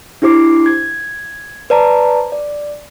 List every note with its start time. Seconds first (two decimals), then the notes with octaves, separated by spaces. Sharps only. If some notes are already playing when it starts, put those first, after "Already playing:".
0.22 D4 E4 G4 C5 D6 C7
0.66 G#6
1.70 B4 C5 D5 A5 A#5
2.32 D5